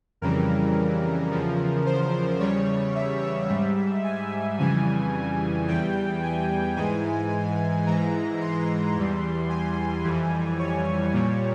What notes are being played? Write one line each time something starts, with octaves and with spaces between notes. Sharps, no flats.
F2 C#3 E3 G3 A#4
E2 C#3 F3
C5
E2 C#3 G3 C#5
E5
G#2 G3
G#5
F2 C#3 E3 G3 G#5
E2 E3 G3 G5
G#5
G#2 E3 G#3 G#5
G#2 E3 G#3 A#5
C6
E2 E3 G3
G#5
F2 E3 G3
C#5
A#2 G3